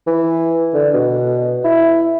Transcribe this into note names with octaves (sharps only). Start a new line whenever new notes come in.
E3
D3
B2
E4